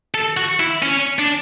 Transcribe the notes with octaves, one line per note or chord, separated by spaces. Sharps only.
A4
F#4
E4
C#4
D4